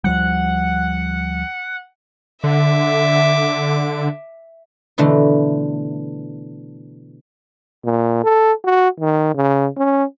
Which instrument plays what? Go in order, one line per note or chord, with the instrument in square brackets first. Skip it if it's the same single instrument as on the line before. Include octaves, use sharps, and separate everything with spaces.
[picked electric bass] D2 F3 G3 [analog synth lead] F#5
[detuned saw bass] D3 [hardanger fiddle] E5 D6
[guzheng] B2 D3 E3 A3
[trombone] A#2
A4
F#4
D#3
C#3
C#4